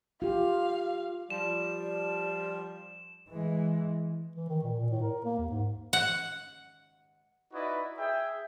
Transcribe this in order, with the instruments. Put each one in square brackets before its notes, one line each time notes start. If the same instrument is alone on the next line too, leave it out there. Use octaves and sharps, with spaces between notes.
[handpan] F4 G4 [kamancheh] F5
[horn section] F3 G3 [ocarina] D5 [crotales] E7
[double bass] E3 G#3
[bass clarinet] E3
D#3
A#2
A#2
A2
A#4
A#3
D#2
G#2
[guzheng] F#5
[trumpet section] D#4 E4 F#4 B4 D5 D#5
G#4 E5 G5